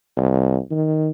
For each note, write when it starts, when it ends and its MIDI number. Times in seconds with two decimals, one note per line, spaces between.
0.17 0.58 36
0.71 1.09 51